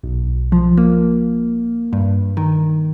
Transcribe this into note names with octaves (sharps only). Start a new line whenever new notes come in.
B1
F3
A#3
G2
D#3